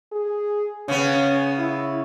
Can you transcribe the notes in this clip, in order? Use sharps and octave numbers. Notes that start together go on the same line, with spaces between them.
G#4
C#3 B3 C#4
E4